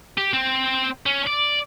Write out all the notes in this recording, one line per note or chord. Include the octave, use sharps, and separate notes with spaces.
G4
C4
C#4
D5